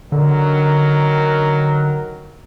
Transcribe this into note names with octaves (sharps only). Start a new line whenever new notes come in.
D3 D#3 F#3 A#4